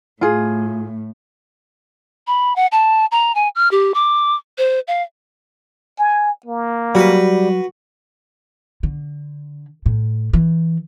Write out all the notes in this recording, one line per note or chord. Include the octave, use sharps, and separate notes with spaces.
A2 F4 G#4
B5
F#5
A5
A#5
G#5
F6
G4
D6
C5
F5
G#5
A#3
F#3 G3 F#4 B4
D3
A2
E3